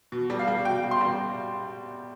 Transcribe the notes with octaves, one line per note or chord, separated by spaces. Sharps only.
B2
G3
F5
G3
B2 G5
B2
C6
G3